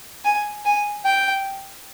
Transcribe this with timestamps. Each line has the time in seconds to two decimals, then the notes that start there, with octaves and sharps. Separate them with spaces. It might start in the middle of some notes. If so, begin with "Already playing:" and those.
0.24 G#5
0.65 G#5
1.05 G5